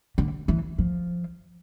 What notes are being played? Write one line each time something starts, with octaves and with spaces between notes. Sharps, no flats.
D3
E3
F3